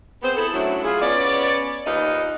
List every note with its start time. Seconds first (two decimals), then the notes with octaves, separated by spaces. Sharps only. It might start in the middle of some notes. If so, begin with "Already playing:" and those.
0.23 B3 C4 G#4 C5
0.36 E4 G#4 A4
0.54 F#3 A3 C#4 D4 E4
0.83 E4 F4 G#4
1.01 B3 C#4 D5
1.85 D#2 D#4 F4 B4 D#5